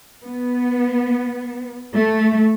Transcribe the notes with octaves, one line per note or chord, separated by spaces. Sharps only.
B3
A3